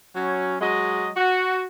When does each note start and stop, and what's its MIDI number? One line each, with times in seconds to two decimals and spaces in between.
0.16 0.58 54
0.16 0.58 61
0.61 1.10 54
0.61 1.10 56
0.61 1.10 75
1.16 1.65 66